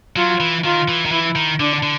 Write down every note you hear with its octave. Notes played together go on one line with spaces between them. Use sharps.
F#3 F4
E3
D#3 F4
E3
D#3
E3 E4
D#3
D3 D4
D3